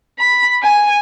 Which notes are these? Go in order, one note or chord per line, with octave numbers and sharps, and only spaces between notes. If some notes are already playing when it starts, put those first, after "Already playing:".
B5
G#5